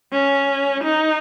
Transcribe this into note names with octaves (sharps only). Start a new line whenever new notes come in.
C#4
D#4